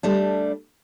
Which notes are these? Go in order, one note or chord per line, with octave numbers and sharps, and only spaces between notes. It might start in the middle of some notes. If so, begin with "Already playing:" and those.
G3 A3 D4